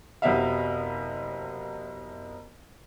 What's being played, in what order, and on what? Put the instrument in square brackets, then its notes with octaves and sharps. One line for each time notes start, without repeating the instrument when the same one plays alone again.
[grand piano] F#1 C3 F#3 B3 E5 F5